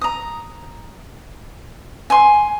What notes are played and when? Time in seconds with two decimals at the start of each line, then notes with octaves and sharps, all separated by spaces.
0.01 A#5 D#6
2.10 G#5 C6